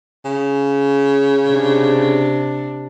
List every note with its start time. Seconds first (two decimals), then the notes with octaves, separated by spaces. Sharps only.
0.25 C#3
1.49 C3 D4